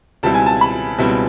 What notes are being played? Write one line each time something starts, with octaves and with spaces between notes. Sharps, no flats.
C#2 B2 G3 C4 E4 A5
G#5
A5
B5
C#2 B2 G3 C4 E4